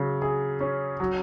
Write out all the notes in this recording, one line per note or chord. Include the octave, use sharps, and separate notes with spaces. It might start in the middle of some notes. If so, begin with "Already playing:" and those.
Already playing: C#3 F#3
G#4
C#4
F#3